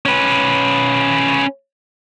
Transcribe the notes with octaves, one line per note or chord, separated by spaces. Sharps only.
C#4 B4